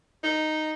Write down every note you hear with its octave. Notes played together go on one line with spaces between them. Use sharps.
D#4